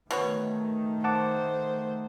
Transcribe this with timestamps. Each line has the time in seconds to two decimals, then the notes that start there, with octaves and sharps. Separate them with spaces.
0.11 B2 D#3 A3 B3 C#5
1.04 C5 F#5 A5 D6